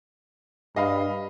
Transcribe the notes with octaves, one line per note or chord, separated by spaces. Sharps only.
G2 D#5 F5 B5